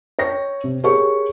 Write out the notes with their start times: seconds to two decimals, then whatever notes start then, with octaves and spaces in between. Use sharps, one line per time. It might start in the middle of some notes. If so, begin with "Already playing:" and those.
0.19 C#5 G5 A#6
0.64 C3
0.84 G4 G#4 A#4 C#5 C#6